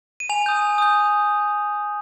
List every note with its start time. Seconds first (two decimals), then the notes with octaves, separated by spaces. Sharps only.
0.20 D#7
0.29 G#5 F7
0.46 D#6 G6
0.62 G#5
0.78 D#6 G6